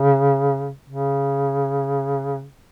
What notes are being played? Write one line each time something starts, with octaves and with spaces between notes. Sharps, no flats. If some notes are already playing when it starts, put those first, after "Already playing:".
Already playing: C#3
C#3